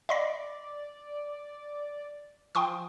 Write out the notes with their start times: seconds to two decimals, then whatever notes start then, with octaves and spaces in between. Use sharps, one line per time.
0.09 D5 D#5 B5 A#6
2.55 F3 G5 C6 D#6